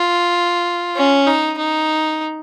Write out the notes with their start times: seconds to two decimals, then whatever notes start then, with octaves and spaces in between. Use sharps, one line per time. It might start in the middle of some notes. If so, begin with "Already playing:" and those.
Already playing: F4
0.96 C#4
1.27 D#4
1.58 D#4